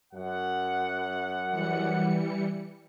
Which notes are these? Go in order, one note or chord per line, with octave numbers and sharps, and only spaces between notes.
F#2 F#5
E3 G3 C#7